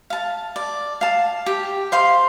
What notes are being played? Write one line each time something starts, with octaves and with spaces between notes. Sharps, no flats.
F5 A5
D5
F5 A5
G4
C5 F5 C6